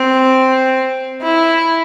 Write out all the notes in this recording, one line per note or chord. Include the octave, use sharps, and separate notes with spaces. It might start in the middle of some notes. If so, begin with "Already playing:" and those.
Already playing: C4
E4